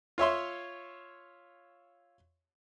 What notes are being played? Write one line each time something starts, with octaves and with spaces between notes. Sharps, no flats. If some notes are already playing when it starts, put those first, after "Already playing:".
F4 C#5 E5 C6